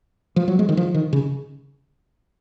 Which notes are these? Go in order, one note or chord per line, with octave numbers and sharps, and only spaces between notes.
F3
F#3
G#3
D#3
F3
D#3
C#3